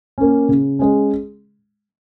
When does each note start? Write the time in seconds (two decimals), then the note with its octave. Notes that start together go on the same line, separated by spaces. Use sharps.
0.18 A#3 C#4
0.48 C#3
0.79 G#3 C#4